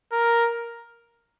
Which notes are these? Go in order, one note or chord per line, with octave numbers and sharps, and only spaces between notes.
A#4